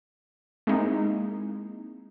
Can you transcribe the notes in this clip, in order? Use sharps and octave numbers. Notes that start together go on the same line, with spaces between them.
G#3 A#3 C4 D#4 E4